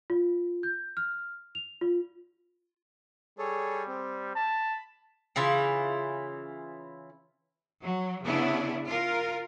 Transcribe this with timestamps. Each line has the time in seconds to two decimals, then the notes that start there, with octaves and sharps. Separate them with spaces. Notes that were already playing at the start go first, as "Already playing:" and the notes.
0.10 F4
0.63 G6
0.97 F6
1.55 F7
1.81 F4
3.39 G3 G#4 A4 C#5
3.88 C4
4.35 A5 B5
5.36 C#3 E3 E4 F4
7.82 F#3
8.22 C#3 B3 D4 E4
8.85 F4 A#4